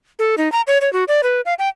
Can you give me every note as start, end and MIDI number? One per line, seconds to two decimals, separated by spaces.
0.19 0.35 69
0.38 0.51 63
0.52 0.61 82
0.67 0.78 73
0.81 0.91 73
0.93 1.04 66
1.08 1.21 74
1.23 1.41 71
1.46 1.54 77
1.59 1.69 79